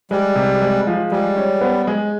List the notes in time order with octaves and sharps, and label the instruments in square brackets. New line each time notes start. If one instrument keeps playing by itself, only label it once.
[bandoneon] G3 [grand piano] G#3
[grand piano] C3
G#3
F3
[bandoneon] G3 [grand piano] G#3
[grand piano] C#4
B3
G#3